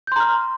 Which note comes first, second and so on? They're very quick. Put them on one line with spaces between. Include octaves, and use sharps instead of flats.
G6 C6 A#5 F6